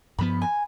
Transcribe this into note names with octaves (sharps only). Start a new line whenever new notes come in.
G2 F3 B3 B5
G#5